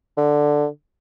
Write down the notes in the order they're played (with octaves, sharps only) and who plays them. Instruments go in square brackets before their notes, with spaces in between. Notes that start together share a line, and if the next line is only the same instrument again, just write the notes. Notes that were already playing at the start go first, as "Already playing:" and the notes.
[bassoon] D3